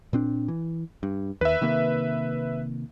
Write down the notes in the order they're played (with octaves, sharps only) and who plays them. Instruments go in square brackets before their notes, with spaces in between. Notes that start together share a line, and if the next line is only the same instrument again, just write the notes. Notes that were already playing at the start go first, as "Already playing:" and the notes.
[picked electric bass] A#2 C4 D4
E3
G2
[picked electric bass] D#2 [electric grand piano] B4 E5
[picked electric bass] C3 D#3 A#3